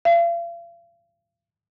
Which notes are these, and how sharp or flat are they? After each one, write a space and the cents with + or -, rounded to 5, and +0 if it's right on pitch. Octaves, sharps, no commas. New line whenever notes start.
F5 -40